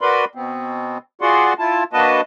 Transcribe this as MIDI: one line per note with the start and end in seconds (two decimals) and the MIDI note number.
0.01 0.25 66
0.01 0.25 70
0.01 0.25 71
0.01 0.25 74
0.01 0.25 83
0.01 0.25 84
0.35 0.98 47
0.35 0.98 59
0.35 0.98 60
1.21 1.53 65
1.21 1.53 66
1.21 1.53 68
1.21 1.53 74
1.21 1.53 78
1.21 1.53 84
1.59 1.84 64
1.59 1.84 65
1.59 1.84 81
1.93 2.21 58
1.93 2.21 62
1.93 2.21 66
1.93 2.21 71
1.93 2.21 75
1.93 2.21 81